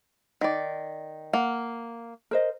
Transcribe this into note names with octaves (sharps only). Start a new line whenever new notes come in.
D#3 D5
A#3 F#5
A#4 C5 D#5